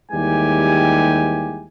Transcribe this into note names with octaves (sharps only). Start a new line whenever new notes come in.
D#2 E3 G3 G#3 G4 G#5